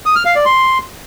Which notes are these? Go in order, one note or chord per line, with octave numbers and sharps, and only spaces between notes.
D#6
F6
F5
D5
C6